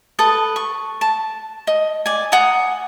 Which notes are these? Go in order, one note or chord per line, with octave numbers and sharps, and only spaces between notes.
A4 B4 D#6
C#6
A5
D#5
D5 G#5
F#5 G#5 A#5 D#6